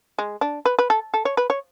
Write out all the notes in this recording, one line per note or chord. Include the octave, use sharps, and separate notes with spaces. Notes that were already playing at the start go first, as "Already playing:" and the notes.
G#3
D4
B4
B4
A4
A4
C#5
B4
C#5